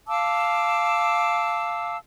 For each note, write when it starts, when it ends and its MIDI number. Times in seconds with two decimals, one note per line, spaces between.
0.07 1.95 77
0.07 1.95 81
0.07 1.95 86
0.07 1.95 88